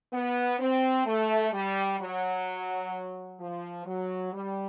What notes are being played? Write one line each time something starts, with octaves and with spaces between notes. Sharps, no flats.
B3
C4
A3
G3
F#3
F3
F#3
G3